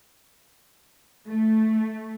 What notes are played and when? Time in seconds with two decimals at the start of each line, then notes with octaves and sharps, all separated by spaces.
1.28 A3